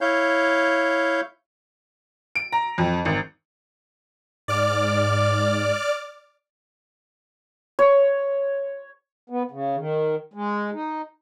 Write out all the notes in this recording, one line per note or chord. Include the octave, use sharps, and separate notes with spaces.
E4 C#5 F5 G6
D7
A#5
F2
G#1
G#2 D5 D6 F6
C#5
B3
C#3
D#3
G#3
D#4